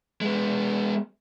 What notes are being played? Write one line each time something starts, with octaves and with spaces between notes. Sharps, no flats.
G#3 B3